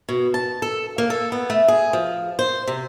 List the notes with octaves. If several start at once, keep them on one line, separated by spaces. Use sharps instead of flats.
B2
A5
A4
A#3
A4
B3
A3
G#4
F3
C5
C3